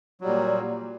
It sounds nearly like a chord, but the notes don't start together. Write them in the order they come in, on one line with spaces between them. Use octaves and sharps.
F#3 G3 A#2